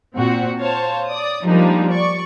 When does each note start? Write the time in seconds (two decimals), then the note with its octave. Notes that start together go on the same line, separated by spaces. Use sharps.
0.15 A#2 C4 F#4
0.58 C5 C#5 F5 A5
1.07 D5 D#6
1.46 F3 G3 G#3 A#3 D4 D#4
1.91 D5 C#6